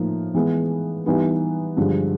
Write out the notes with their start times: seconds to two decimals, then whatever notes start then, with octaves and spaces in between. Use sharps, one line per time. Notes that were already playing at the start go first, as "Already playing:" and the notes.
Already playing: A2 F3 A#3 D#4
0.34 E3 G#3 B3
1.06 E3 G3 B3 D#4
1.77 G2 D3 F3 G#3